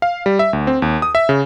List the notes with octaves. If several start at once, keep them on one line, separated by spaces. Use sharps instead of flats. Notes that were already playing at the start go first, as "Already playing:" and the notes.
F5
G3
E5
D2
C4
D#2
D#6
E5
C#3